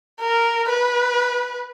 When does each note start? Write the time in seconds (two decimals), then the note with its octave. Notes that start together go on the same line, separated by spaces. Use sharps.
0.21 A#4
0.69 B4